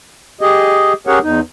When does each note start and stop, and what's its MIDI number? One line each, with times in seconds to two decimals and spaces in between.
0.41 0.93 67
0.41 0.93 68
0.41 0.93 75
1.07 1.19 61
1.07 1.19 67
1.07 1.19 68
1.07 1.19 70
1.07 1.19 73
1.07 1.19 78
1.23 1.40 40
1.23 1.40 63